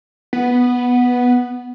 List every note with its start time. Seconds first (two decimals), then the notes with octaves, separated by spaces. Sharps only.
0.33 B3